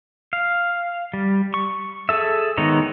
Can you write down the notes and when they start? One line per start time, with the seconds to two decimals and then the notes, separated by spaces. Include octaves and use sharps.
0.33 F5
1.14 G3
1.54 C#6
2.09 G#4 A4 E5
2.57 D#3 G#3 B3 D#4 C#5